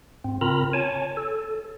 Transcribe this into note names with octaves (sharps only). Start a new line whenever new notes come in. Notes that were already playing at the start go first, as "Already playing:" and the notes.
G#2 C4
C#3 C4 F4 A#4 A#5 B5
C#5 G#5 A5
A4